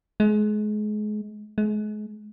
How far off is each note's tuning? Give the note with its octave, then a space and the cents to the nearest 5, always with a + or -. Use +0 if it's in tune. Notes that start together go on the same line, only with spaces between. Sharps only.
G#3 +30
G#3 +35